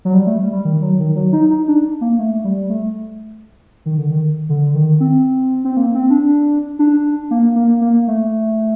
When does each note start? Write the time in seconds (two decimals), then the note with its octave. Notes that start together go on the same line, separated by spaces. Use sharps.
0.05 F#3
0.14 G3
0.27 A3
0.39 G3
0.52 G3
0.65 D#3
0.82 F#3
1.00 D#3
1.16 F#3
1.33 D#4
1.50 D#4
1.68 D4
2.01 A#3
2.19 A3
2.44 G3
2.70 A3
3.86 D#3
3.98 D3
4.10 D#3
4.49 D3
4.75 D#3
5.00 C4
5.64 C4
5.77 A#3
5.95 C4
6.10 D4
6.79 D4
7.31 A#3
7.56 A#3
7.81 A#3
8.08 A3